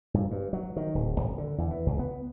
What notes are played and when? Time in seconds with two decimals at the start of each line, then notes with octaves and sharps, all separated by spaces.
0.14 G2
0.31 G2
0.53 F#3
0.76 D#3
0.95 D1
1.20 G#1
1.38 D3
1.58 E2
1.71 E3
1.86 C#2
1.99 B3